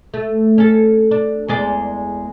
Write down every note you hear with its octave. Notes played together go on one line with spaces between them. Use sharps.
A3
C#4 A4
D4
E2 G#3 D5